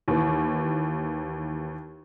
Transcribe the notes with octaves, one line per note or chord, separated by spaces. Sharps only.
D#2 E3